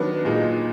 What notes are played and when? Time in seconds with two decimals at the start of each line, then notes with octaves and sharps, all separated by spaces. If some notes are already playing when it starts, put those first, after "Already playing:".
Already playing: D#3 F#3 B3 D4 B4
0.25 A#2 G#3 D#4